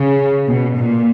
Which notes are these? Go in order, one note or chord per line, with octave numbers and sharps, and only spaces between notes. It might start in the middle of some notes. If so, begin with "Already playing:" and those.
Already playing: C#3
B2
A#2